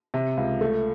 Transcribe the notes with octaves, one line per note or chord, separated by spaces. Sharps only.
C3
C#2
A3